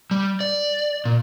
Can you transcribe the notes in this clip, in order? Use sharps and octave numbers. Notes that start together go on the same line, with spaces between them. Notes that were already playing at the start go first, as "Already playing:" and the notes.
G3
D5
A#2